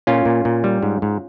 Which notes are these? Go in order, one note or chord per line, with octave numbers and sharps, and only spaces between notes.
A#2 C#4 F4
A#2
A#2
G3
G#2
G#2